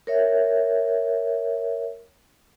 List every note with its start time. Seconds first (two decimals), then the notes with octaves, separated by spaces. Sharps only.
0.07 A#4 C#5 E5